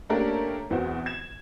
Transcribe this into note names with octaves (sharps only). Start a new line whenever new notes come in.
A3 A#3 C#4 D4 G4 A#4
E2 E3 C4 F#4
G#6 E7